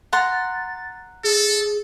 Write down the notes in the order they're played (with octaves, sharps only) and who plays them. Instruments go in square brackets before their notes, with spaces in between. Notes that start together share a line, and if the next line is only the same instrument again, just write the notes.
[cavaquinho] F#5 A#5 C6 [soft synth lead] A6
[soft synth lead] G#4 [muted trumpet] A4